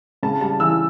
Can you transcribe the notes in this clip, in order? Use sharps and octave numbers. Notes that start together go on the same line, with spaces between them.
C#3 A5
G3 A5
E3 E6